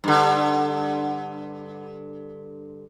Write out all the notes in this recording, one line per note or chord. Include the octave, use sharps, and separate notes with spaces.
G2 D3